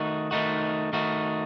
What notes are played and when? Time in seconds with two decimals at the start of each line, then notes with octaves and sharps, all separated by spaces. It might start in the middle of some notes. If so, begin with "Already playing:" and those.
Already playing: D#3 A3 D#4 F#4
0.31 D#3 A3 D#4 F#4
0.93 D#3 A3 D#4 F#4